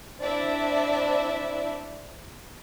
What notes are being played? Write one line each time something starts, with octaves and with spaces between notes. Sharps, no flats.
C4 D4 E4 D5 E5